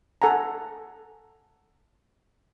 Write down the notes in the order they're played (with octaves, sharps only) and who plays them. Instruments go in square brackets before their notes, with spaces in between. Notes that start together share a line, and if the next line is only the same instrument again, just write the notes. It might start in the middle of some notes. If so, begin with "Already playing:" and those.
[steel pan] A4 F#5 G#5 A#5